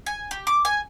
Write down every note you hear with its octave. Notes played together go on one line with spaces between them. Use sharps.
G#5
G4
D6
G#5